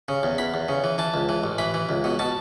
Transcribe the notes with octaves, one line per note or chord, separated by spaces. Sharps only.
C#3
E2
E2 B5
E2
C#3
E3
E3 A5
C#2
E3
A1
E3 B5
E3
C#2
B2
B2 A5